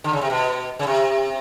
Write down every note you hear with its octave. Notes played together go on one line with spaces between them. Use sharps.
D3
C#3
C3
B2
C#3
C3